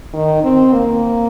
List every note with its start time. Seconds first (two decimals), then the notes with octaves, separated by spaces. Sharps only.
0.13 D#3
0.43 C4
0.73 A#3